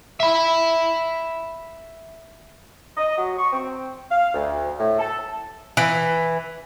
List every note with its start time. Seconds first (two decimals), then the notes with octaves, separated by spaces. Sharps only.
0.20 E5 B5
2.97 D#5
3.17 F#3
3.38 C#6
3.53 C4
4.11 F5
4.34 D2
4.78 A2
4.99 A4
5.77 E3